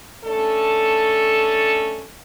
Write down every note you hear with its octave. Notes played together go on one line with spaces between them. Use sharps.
A3 C#4 D4 A4